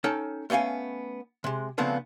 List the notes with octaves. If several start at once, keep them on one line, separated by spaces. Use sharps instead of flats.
C#4 D#4 A4 C#5 G5 A5
A3 B3 C#4 F5 G#5
C3 G#3
C#3 F3 A3 B3 C4 D4